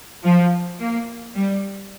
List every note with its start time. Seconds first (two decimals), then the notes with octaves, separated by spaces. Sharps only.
0.23 F3
0.79 A#3
1.35 G3